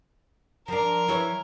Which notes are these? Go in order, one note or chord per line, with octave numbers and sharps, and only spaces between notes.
F3 D4 A#4
E3 E4 C#5